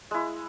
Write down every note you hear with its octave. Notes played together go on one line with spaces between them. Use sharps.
G#3 E4